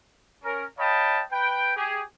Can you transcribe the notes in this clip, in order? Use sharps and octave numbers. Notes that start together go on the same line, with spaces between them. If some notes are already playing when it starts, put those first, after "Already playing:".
C#4 A#4
C#5 D#5 F5 G5 A5 B5
B4 G5
G4 G#4